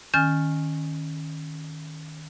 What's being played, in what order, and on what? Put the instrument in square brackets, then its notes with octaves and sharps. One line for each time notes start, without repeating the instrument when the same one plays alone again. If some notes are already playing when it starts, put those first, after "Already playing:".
[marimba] D#3 C#4 G#5 F6 G6 A6